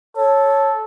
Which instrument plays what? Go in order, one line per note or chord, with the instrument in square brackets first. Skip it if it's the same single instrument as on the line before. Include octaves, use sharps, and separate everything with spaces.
[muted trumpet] A4 [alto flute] C#5